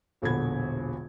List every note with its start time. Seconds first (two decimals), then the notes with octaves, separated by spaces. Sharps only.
0.22 E1 A#1 D3 B3 B5 G#6